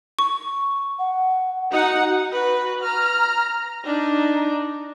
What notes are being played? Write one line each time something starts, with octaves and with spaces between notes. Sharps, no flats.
C#6
F#5
D#4 F#4 F#5
F#4 B4
A#5 F6
D4 D#4